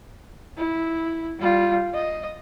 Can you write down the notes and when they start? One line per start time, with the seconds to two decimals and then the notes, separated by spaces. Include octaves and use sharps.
0.57 E4
1.39 G3 F4
1.95 D#5